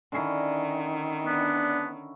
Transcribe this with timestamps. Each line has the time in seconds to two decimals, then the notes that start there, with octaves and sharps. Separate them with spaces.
0.12 D3 D#3 C#4 E4
1.26 B3 D4